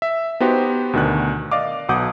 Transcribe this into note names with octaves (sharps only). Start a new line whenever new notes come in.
E5
B3 D#4 F#4 G4 C5
D2 B2 D#3 D4 F#6
D5 D#5 F5 D6
B1 B2 F#5 D6 D#6 G6